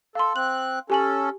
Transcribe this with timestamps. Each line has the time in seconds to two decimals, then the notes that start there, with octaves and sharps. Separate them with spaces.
0.15 A4 F5 C6
0.36 C4 F#6 F#7
0.90 C#4 G4 A4 G#5 F#7